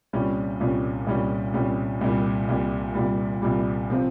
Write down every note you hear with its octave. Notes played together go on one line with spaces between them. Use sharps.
C2 A#2 G3 C#4
C2 A#2 G3 C#4
C2 A#2 G3 C#4
C2 A#2 G3 C#4
C2 A#2 G3
C2 A#2 G3
C2 A#2 G3
C2 A#2 G3
C3 F3 C4